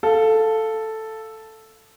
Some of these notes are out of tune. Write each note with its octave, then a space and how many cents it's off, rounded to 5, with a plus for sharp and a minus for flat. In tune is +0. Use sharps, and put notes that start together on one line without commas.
A4 +0 F5 +0